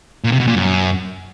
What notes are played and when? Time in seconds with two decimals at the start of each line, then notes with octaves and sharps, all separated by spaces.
0.24 A#2
0.32 C3
0.40 B2
0.47 A#2
0.55 F#2